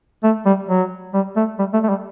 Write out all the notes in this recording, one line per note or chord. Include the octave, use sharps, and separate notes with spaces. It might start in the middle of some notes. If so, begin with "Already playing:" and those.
A3
G3
F#3
G3
A3
G3
A3
A3
G3